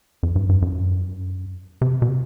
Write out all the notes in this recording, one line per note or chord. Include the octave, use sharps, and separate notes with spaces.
F2
G2
G2
F#2
C3
B2
C3